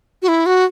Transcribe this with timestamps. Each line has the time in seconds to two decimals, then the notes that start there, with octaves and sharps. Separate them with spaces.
0.22 F#4
0.28 E4
0.46 F#4